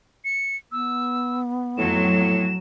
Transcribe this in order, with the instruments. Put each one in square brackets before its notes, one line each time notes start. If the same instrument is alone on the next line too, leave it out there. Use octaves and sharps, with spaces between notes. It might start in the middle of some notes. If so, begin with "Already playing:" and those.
[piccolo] C#7
[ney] B3 [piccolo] E6
[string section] F2 F#3 [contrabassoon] A2 [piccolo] E7